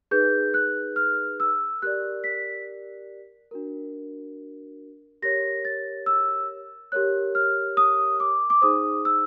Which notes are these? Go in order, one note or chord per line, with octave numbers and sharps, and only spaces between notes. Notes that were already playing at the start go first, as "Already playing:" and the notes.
D#4 G#4 B4 G6
F#6
F6
E6
G4 A#4 D5 F#6
B6
D4 F#4 A#4
G4 A#4 C#5 A#6
A6
E6
G4 A#4 C#5 F#6
F6
D#6
D6
D6
D#4 G#4 C5 D#6
E6